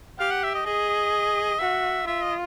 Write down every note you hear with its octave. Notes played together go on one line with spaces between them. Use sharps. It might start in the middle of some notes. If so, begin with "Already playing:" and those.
G4 F5
F#5
E5
D#5
G#4 D#5
F#4 E5
F4 E5
D#5